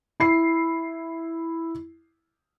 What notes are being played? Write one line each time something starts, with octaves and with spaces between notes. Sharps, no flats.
E4 C7